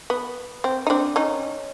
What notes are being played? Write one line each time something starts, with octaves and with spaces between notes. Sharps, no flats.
B3
C4
D#4
C4 D4
C#4 D#4